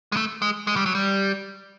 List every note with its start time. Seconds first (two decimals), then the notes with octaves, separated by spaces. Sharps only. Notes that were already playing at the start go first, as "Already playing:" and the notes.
0.12 G#3
0.17 A3
0.42 G#3
0.67 G#3
0.76 G3
0.86 F#3
0.95 G3